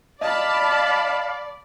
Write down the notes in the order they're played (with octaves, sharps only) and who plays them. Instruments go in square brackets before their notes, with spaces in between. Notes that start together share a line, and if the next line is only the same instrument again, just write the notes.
[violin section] D5 [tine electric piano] D#5 [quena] F5 [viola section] A5 B5